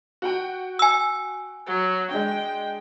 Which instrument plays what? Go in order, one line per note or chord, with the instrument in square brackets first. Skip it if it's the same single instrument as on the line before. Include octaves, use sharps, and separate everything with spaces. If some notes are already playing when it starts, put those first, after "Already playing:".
[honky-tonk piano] F#4 F#5 G5
[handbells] G#5 E6
[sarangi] F#3
[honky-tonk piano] G#3 D4 [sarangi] G5